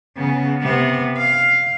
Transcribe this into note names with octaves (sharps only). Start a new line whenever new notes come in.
C#3 B3
C3 B3
F5